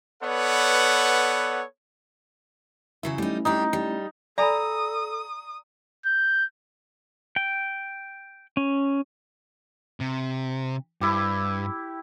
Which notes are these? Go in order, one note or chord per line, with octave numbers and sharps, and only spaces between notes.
B3 A4 B4 C#5 D5 F#5
C#3 F#3 E4 E5
G3 A3 C#4 D#4 E4
G3 D4 D#4 G4
G3
A4 D5 G#5 A#5 B5 D#6
G6
G5
C#4
C3
G2 E4 G4